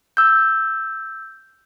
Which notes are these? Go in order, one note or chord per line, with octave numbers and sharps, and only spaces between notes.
E6 G6